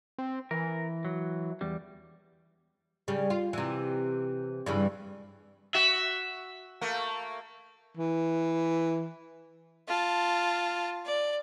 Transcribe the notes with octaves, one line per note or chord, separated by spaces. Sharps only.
C4
E3 A#4
F#3
E2 G3
C#3 G3
F4
C3 E3
G2 C#3 E3
F#4 E5
A3 A#3 A#4
E3
F4 A5
D5